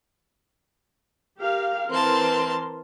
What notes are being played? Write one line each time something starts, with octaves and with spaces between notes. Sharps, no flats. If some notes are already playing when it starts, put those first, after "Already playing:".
G4 A#4 F5
E3 C4 A#4 A5 C6